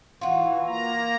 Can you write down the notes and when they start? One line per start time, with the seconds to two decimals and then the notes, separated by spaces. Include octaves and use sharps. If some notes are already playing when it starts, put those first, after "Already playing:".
0.21 E3 F4 F#4
0.67 A#3 A#5